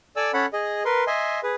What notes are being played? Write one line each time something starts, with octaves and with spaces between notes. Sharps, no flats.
A4 D5 G#5 D6 E6
C#4 A4 C#5 F#5 B5
G#4 D#5
A#4 B4 C6
D#5 E5 G#5 C6
G#4 B4